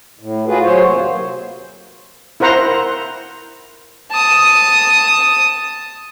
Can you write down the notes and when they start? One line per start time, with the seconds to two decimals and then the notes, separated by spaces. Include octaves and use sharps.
0.19 A2
0.47 F4 F#4 G#4 B4
0.63 F#3 C5 C#5
0.85 D#2 C3 A#3
2.40 E4 A#4 C5 F#5 A#5 C6
4.11 A5 D#6